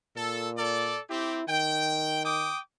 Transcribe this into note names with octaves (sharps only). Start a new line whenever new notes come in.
A#2 A4
A4 D5
C4 E4 G4
D#3 G5
G5 D6 D#6